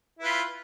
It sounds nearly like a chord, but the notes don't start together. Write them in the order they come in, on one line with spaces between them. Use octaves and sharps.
E4 B4 F4